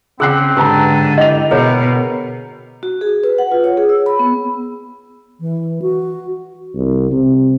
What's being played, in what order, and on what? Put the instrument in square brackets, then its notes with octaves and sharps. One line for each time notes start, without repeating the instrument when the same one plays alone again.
[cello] C#3 [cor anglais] C4 [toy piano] G#4 G5 [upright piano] E6 F#6 C7
[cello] G#2 D3 [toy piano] G4 [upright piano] B4 A5 A#5
[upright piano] E4 F7 [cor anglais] G4 [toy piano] D#5
[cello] B2 [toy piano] G#4 B4 C#5 [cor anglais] A#4
[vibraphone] F#4
G#4
B4
F#5
F4
C#5
G#4
E6
B5
B3
[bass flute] E3
F#4
[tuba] C2
C3